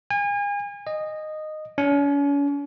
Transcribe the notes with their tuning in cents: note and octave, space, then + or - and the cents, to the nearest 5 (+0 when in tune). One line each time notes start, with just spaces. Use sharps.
G#5 -35
D#5 -10
C#4 +40